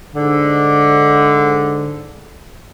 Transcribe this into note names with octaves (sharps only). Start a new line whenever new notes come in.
G#2 D3